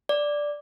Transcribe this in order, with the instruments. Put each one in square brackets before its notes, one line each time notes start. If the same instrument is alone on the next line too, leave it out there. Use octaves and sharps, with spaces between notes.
[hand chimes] D5